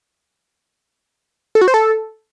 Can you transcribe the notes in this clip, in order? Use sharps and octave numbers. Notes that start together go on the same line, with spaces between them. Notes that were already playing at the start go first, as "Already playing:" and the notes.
A4
F#4
C5
A4